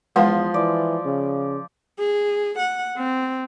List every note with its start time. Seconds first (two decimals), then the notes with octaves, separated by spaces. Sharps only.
0.16 E2 F3 G#3 B4 F5 C6 D#6
0.54 E3 D5
1.05 C#3
1.99 G#4
2.59 F#5
2.97 C4